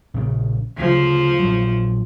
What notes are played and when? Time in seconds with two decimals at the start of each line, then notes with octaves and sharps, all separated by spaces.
0.14 A#1 C#3
0.78 D2 C#3 F3
1.39 A#1 F#3